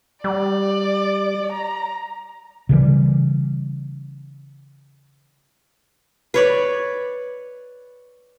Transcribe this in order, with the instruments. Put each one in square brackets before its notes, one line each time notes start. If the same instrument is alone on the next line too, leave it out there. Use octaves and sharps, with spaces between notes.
[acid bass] G3 [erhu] D5
[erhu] A#5
[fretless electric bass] C#3 E3 G3
[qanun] B4 C#5 D5